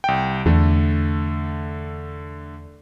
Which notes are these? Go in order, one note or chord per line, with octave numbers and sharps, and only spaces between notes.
C2 G5
E2 D3 A3